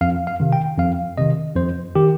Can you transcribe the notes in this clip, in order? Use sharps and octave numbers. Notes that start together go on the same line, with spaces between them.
F2 F5
F5
C3 D#3
G5
F2 F5
C3 D#3 D#5
F2 C5
D#3 G4